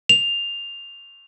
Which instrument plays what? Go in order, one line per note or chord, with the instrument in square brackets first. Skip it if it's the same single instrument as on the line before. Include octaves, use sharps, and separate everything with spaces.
[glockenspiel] F7